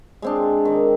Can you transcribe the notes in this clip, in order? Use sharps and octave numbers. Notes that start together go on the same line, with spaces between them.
G#3 C4 D4
D#3